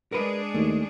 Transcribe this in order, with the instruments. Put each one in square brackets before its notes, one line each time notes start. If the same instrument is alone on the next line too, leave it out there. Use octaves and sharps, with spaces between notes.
[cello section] G#3 D4 G#4 [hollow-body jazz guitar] A#4 B4
[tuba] D#2 [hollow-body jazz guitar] A3